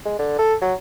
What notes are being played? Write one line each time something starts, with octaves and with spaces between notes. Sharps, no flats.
G#3
D3
A4
F#3